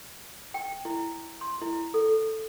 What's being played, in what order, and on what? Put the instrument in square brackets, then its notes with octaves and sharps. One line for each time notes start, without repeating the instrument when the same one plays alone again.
[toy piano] G5
E4
C6
E4
A4